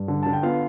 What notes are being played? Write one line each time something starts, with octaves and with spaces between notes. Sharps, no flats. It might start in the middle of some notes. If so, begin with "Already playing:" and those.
Already playing: G2
D3
D3 A5
G5
B3 F4 F5